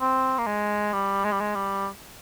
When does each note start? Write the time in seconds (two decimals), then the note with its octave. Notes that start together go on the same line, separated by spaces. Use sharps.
0.01 C4
0.38 A#3
0.47 G#3
0.93 G3
1.24 G#3
1.32 G3
1.40 G#3
1.55 G3